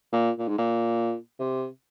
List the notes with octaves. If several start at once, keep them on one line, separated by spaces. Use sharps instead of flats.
A#2
A#2
G#2
A#2
C3